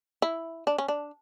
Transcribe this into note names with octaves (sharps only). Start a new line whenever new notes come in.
E4
D4
C#4
D4